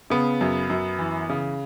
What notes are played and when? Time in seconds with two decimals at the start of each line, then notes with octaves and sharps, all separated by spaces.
0.10 C#3 B3
0.41 F#2
0.70 F#2
0.99 E3
1.29 C#3